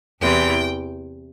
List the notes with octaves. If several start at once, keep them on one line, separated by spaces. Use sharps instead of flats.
E2 C3 E3 G5